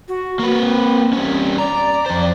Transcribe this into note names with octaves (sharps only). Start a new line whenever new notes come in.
F#4
A#3 B4
C4
G3 C#4
D5 A#5
F2 C5